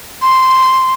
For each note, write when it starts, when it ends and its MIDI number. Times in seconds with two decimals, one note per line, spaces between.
0.22 0.94 84